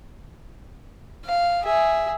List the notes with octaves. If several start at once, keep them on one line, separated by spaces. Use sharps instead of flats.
F5
G#4 E5